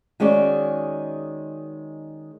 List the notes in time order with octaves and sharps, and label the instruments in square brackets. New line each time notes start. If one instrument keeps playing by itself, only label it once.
[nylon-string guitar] D#3 G#3 C#4 F#4 D5